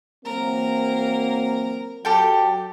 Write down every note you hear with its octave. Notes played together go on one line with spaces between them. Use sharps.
E3 F#3 A#3 C4 A#4
F#3 G4 A4 G5